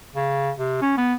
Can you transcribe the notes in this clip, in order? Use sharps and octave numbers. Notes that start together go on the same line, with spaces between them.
C#3
C3
C#4
B3